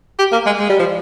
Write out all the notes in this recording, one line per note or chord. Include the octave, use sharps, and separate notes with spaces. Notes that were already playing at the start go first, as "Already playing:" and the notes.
G4
A#3
G#3
G#3
G3
F3